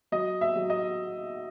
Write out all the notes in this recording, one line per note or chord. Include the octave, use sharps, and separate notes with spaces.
F#3 D#5
E5
F#3
D#5